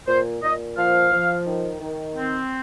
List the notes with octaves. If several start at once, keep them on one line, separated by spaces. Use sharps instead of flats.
A#2 C5
A#2 D#5
F3 F5
F3
D#3
D#3
C4